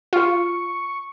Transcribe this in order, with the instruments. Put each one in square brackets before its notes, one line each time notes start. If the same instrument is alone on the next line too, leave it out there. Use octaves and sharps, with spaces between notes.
[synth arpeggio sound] F4 [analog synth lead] C#6